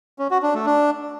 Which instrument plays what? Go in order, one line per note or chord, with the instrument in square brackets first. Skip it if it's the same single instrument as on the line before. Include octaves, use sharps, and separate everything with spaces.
[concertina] C#4
F#4
D4
A3
D4